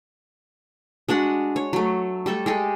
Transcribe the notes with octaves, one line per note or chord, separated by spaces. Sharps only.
G#3 D4 F#4 F#5
C#5
F#3 A3
G3 A3 A4
G#3 G4 A4